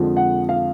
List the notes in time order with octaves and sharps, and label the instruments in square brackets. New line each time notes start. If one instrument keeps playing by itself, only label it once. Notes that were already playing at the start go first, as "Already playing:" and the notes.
Already playing: [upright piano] F2 D3 F3 G#3
F#5
F5